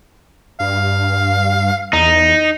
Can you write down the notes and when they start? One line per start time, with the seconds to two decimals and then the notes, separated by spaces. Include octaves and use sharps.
0.60 G2 F5
1.93 E2 D#4